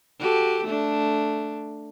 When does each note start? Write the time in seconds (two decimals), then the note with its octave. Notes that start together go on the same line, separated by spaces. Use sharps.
0.19 F#4 G4 A4
0.65 A3 D4